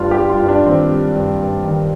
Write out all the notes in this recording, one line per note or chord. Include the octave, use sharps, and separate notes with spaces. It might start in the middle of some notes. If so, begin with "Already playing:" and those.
Already playing: G2 F4
G4
G3
F4
G2
D4
D#3 C4
G3
G2
G2
D#3